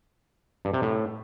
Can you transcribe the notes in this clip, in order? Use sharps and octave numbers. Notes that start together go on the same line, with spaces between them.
G2
C3
A2